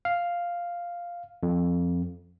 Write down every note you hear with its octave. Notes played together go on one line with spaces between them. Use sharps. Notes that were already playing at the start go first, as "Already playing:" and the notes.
F5
F2